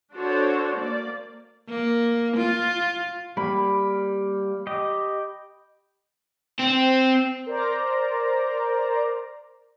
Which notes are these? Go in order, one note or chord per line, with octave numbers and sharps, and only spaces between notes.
D4 F#4 A4 C5 C#5
A#3 D5
A#3
F4
G3 A#3 B5
G4 D#5
C4
A#4 C5 D5 A#5